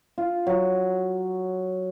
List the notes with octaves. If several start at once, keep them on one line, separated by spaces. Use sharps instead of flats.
F4
F#3